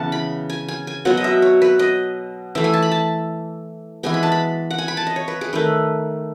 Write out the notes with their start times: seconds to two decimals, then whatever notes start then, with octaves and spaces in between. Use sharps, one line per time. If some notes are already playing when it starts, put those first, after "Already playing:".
Already playing: C#3 E3 B3 F#5 A5
0.12 B5
0.50 G#5
0.68 G#5
0.87 G#5
1.05 B2 F#3 B3 F#5
1.17 D#5
1.24 E5
1.42 C#5
1.62 B4
1.79 D#5
2.55 E3 A3 E5
2.64 G#5
2.74 A5
2.83 B5
2.92 A5
4.03 E3 G#3 B3 G#5
4.14 B5
4.23 A5
4.32 B5
4.71 F#5
4.78 G#5
4.88 B5
4.97 A5
5.07 D#5
5.16 C#5
5.28 B4
5.41 G#4
5.53 D#3 A3 B4